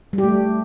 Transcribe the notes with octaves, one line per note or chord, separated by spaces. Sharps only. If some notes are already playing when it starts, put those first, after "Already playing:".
G3
G4
A3
G3